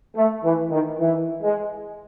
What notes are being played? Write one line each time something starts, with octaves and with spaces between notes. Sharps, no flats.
A3
E3
D#3
E3
G#3